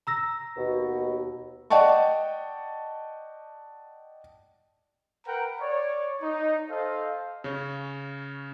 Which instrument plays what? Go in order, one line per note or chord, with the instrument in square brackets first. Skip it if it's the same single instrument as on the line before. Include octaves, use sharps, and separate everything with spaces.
[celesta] A#5 E6 A#6
[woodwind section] D#2 B2
[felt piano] D5 D#5 F#5 G5 A5 C#6
[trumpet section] A#4 B4 F#5 G5 A#5
C#5 D5
D#4
A4 C5 D#5 F5
[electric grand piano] C#3 C#4